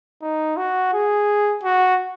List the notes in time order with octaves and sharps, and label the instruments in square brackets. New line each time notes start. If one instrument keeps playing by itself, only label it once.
[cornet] D#4
F#4
G#4
F#4